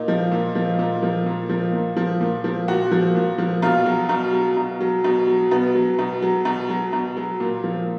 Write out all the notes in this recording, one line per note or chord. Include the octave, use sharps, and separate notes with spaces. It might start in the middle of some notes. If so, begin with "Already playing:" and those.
Already playing: A#2 D#4
F3
A#2
F3
A#2
F3
A#2
F3
A#2
F3
A#2
F3
A#2 F#4
F3
A#2
F3
B2 F4
F#3
B2
F#3
B2
F#3
B2
F#3
B2 B3
F#3
B2
F#3
B2
F#3
B2
F#3
A#2
F3